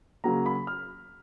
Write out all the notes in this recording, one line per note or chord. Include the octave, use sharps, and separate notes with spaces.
C#3 F#3 A#3 A#5
B5
F6